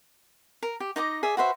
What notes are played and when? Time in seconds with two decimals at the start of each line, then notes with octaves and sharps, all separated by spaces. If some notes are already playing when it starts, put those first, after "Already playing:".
0.63 A#4
0.80 G4
0.96 D#4 D5 D#5 D6
1.23 G#4 D5 E5
1.37 F#4 B4 C5 E5